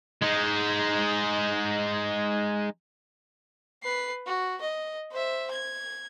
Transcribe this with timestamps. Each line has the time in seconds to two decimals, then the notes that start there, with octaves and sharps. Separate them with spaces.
0.22 G#3 D#4
3.83 B4 C7
4.26 F#4
4.61 D#5
5.11 C5 E5
5.51 G#6